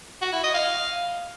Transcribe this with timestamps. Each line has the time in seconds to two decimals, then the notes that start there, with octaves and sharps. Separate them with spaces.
0.22 F#4
0.33 E4
0.43 D#5
0.54 F5